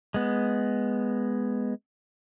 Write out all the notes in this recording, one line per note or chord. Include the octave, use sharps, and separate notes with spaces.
G#3 B3